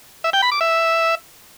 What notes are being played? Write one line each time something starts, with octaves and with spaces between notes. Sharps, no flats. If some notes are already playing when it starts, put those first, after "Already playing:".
E5
G5
B5
D6
E5